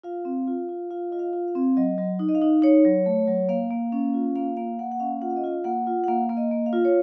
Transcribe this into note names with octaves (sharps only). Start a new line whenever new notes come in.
F4 F5
C4
F4
F4
F4 F5
F4 D#5
F5
F4
F5
C4
F#3 D#5
F#3
D#4
D#5
F5
D#4
D#4 C#5
F#3
A3
F#3
A#3 F5
A#3
C#4
F4
A#3 F5
A#3 F5
A#3 F#5
F#5
C#4 F5
F4 F#5
F5
D#5
F4 F5
A#3 F#5
F4
F#5
A#3 F5
A#3
D#5
A#3
F5
F4
C#5